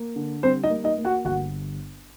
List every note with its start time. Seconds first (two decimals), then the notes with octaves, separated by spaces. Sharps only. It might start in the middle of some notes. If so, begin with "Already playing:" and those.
Already playing: A#3
0.16 D3
0.43 G3 C4 C5
0.64 D#4 D#5
0.70 A#3
0.84 D#4 D#5
0.98 A#3
1.05 F#4 F#5
1.25 G1 F#4 F#5